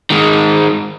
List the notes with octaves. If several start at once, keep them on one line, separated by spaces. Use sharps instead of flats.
D#3 G#3